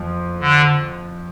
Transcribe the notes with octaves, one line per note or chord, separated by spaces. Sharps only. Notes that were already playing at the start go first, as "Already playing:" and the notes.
Already playing: F2 F3
D3